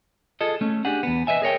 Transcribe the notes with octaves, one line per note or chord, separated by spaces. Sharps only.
F4 G#4 A4 D#5
A3 C#4
D4 G4 G#4 F#5
E2 B3
B4 C#5 D#5 E5 G#5
G#4 A#4 C#5 G5